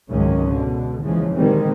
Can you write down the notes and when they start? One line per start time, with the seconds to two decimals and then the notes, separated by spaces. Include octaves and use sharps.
0.11 G#1 C#2 F#2 D#3 G#3 C#4
0.50 B2 D3
1.01 D#2 C#3 E3 F3 G#3
1.35 A#2 D3 D#3 G3 G#3 C4